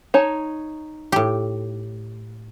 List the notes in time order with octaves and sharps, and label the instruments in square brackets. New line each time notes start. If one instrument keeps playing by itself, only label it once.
[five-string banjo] D#4 C#5 A5
[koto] A2 G4